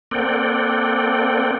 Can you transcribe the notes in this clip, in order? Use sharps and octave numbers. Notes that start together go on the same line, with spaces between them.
A#3 C4 A4 D5 F#5 G5